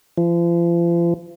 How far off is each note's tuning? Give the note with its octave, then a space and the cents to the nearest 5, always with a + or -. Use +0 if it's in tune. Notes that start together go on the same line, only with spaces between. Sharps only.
F3 -40